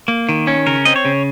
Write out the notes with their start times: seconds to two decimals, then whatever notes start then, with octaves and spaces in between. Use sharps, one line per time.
0.08 A#3
0.29 D#3
0.47 C#4
0.66 C#3 A#4
0.85 C4 D#5
0.96 C#5
1.05 C#3